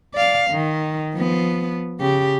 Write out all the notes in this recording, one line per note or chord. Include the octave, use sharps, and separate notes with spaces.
D5 F5
D#3
F3 B3
C#3 G4